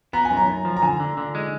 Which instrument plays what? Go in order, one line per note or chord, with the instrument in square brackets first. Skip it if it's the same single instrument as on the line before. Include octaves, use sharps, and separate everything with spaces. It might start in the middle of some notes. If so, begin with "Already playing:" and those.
[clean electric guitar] B3 [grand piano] A#5
[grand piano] G#5
[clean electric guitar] F#2
[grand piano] A#5
[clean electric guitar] F#2
F3
[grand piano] A#5
[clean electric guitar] D3 [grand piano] G#5
[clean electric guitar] D3
D3
G#3